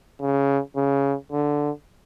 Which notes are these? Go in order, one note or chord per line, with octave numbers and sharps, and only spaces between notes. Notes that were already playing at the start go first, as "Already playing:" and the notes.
C#3
C#3
D3